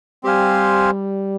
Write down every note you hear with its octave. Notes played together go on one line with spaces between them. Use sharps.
G3 C4 G4 C5 F5 G#5